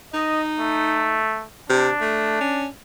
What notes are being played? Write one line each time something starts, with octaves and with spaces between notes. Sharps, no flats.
D#4 D#5
A3
C3 D4
A3
C#4